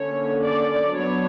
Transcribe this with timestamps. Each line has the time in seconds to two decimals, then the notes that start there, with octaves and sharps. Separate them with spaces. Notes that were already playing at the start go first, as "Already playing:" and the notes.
Already playing: D3 A#3 C#4 C#5
0.41 D5
0.93 F#3 B3 D4 C#5